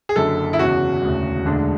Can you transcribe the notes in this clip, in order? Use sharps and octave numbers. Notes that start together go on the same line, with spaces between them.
G#4
F#1 F#2 D3 A4
E4
E1 E2 C#3 F#4
E1 D2 C#3
E1 D2 D3 G#3 D4